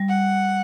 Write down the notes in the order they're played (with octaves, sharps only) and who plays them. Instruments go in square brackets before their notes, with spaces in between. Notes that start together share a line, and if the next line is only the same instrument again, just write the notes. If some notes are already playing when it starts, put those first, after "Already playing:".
Already playing: [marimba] G3
[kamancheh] F#5